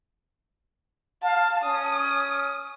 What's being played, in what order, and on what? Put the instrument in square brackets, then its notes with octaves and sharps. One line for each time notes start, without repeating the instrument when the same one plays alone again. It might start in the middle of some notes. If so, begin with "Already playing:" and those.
[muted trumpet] F5 [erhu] A5
[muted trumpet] C#4 [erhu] D#6